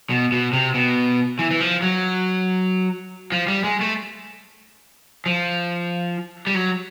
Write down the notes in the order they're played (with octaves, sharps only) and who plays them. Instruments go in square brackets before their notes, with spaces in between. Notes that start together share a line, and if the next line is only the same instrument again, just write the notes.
[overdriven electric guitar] B2
B2
C3
B2
E3
E3
F3
F#3
F3
G3
G#3
A3
F3
G3
F#3